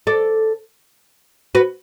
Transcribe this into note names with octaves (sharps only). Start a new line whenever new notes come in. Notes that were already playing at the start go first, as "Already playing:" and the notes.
A4 D5
F#4 B4